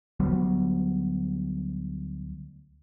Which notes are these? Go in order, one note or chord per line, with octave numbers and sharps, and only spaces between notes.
D2 F#3 G3 B3